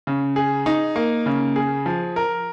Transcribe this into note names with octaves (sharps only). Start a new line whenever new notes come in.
C#3
G#4
D#4
A#3
C#3
G#4
F3
A#4